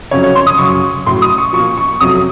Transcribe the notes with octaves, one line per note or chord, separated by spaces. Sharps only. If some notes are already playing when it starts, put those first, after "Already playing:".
F2 C#3 F#3 C#5
C#5
C6
D#6
F#2 C#3 F#3 C#6
A2 F#3 C6
D#6
C#6
A#2 F3 C#6
C#6
F2 C3 F#3 D#6